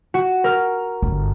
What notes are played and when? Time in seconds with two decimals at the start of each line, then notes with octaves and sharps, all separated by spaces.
0.14 F#4
0.44 A#4 F6
1.02 G1